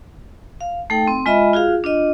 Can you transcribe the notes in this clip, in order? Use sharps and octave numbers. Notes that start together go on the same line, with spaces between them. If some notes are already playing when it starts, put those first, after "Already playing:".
F5
A3 D#4 A4 G5
C4
G#3 F4 D#5 E5 B5
F4 F#4 G#4 F5
D4 F4 D#5